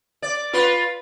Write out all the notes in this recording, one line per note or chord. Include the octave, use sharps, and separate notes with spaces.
D5
F4 B4